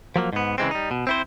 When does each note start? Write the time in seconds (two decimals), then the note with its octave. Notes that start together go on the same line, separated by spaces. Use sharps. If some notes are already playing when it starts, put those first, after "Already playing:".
0.16 F3 F#3 A#3
0.33 G#2 B3
0.58 C#3 E3 G#3 C4
0.71 G3 D#4
0.91 B2
1.07 C4 E4 C5